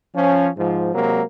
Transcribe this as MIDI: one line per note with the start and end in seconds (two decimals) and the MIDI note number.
0.14 0.48 53
0.14 0.48 61
0.57 0.89 44
0.57 0.89 53
0.94 1.21 48
0.94 1.21 54
0.94 1.21 56
0.94 1.21 58